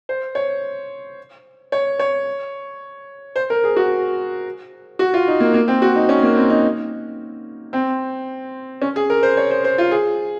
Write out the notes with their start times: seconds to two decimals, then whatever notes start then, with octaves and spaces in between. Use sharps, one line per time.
0.09 C5
0.35 C#5
1.72 C#5
1.99 C#5
3.36 C5
3.50 A#4
3.64 G#4
3.76 F#4
4.99 F#4
5.14 F4
5.28 D#4
5.40 A#3
5.54 A#3
5.68 C4
5.82 F#4
5.96 D#4
6.09 C#4
6.22 A#3
6.36 C4
6.50 D#4
7.73 C4
8.82 C#4
8.96 G#4
9.10 A#4
9.23 C5
9.37 C#5
9.51 C5
9.64 C5
9.78 F4
9.91 G#4